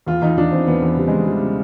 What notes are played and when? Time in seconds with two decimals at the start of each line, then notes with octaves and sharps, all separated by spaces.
0.07 E2 F4
0.22 E2 D#4
0.37 E2 D4
0.52 E2 C4
0.67 E2 B3
0.82 E2
0.87 B3
0.97 C#3 G3
1.08 E2 G#3
1.27 E3 G3
1.43 C#3